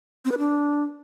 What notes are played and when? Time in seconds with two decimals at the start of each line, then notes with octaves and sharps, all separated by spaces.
0.25 C4
0.31 B4
0.38 D4